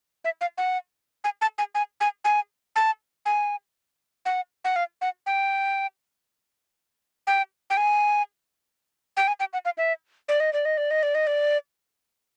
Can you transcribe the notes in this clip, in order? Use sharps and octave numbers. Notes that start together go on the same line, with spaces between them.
E5
F5
F#5
G#5
A5
G#5
G#5
G#5
G#5
A5
G#5
F#5
F#5
F5
F#5
G5
G5
G5
G#5
G5
G#5
G5
F#5
F5
E5
D5
D#5
D5
D#5
D5
D#5
D5
D#5
D5